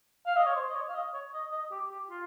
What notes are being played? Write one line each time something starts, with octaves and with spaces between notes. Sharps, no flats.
F5
D#5
C#5
C5
D#5
C#5
F5
D#5
C#5
D#5
D#5
G4
G4
F4